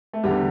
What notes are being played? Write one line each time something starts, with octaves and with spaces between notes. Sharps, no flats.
A3
E2 D3 G3